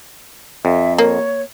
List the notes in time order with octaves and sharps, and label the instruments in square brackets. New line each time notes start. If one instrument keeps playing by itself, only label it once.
[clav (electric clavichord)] F2 [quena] E5
[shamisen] A#3 [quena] C#5